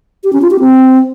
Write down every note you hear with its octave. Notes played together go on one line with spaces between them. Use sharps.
G4
C#4
F4
G4
C4